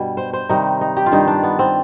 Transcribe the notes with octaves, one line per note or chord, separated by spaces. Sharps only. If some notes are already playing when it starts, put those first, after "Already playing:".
Already playing: G2 B2 G3
C5
C5
C3 D#3 G3 D#4
D#4
G4
F4
G2 D#3 G3 D#4
D4
B3
C4